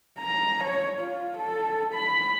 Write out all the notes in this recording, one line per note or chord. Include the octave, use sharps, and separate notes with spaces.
A#5
C#5
F4
A4
B5